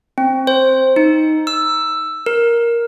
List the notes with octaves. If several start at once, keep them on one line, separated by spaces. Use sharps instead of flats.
C4
C5
D#4
E6
A#4